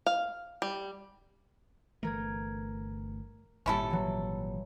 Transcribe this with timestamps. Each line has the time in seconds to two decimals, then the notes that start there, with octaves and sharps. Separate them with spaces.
0.06 F5
0.62 G3
2.03 G1 E3 A3 A#4 G#6
3.66 G#1 A#2 G3 C#4 E4 A4
3.90 E3 F#3